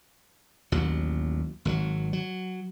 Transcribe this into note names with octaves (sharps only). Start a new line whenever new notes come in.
A1 D#2 F#3
G#1 C#3 F#3
F#3